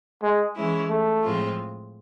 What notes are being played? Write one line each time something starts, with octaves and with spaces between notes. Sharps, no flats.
G#3
E3 G#3 C#4 E4
A3
A2 F3 G#3 C4 F4